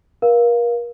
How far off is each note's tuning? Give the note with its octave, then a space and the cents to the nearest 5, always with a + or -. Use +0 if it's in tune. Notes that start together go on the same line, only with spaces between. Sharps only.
A#4 +35 F5 +0